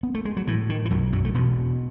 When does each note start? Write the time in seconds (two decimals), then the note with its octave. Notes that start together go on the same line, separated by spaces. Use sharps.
0.03 B3
0.15 A3
0.25 G#3
0.37 F#3
0.47 A2 E3
0.69 D#3
0.85 E3
0.91 B1 F#2 F#3
1.13 F#2 F#3
1.25 A3
1.34 E1 B2 B3